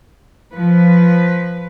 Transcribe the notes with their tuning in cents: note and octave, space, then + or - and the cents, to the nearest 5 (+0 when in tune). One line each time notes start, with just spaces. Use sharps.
F3 +0 B4 +5